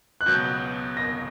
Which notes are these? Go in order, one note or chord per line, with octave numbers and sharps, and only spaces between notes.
F#6
C#2 B2 F#3 B3 G6
A#6